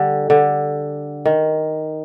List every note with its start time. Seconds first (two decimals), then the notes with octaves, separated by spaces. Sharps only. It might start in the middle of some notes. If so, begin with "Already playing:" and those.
Already playing: D3 G3
0.30 D3
1.26 D#3